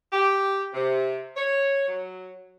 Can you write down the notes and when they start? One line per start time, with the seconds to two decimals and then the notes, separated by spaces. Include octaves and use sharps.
0.12 G4
0.74 C3
1.36 C#5
1.88 F#3